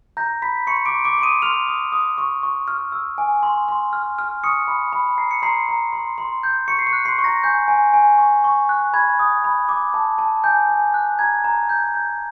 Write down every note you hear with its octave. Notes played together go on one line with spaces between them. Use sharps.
A#5 G6 A#6
B5 B6
C6 C#6 C#7
D6 D7
C6
D6 D7
C6
D#6 D#7
C6 F6 F7
D#6
D#6
C#6
C#6
F6
E6
G#5
C6
C6
F6
F6
C#6 D#6 C#7
B5
B5
A#5 C7
C#7
A#5 C6 C7
A#5
C6
C6
G6
C#6 C#7
C7
C#6 C#7
F#6
C6 C7
C#6
A#5 A#6
G#5 G6
G#5
G#5
C#6
C#6
F#6
B5 G#6
D#6
B5
D6
A5
A5
G#5 G6
G#5
F#6
A#5 G#6
A#5
G6
G6